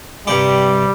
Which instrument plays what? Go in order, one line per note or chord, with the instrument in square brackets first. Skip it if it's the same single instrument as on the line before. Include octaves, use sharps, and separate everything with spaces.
[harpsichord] G2 C3 G4 [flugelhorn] G3